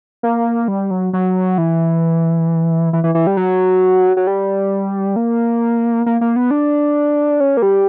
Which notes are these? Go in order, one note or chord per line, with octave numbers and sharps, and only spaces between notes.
A#3
G3
F#3
F#3
E3
E3
E3
E3
G3
F#3
F#3
G3
A#3
A#3
A#3
B3
D4
C#4
A#3
G3